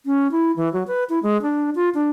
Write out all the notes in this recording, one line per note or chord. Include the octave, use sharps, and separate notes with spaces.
C#4
E4
E3
F#3
B4
E4
G#3
D4
F4
D4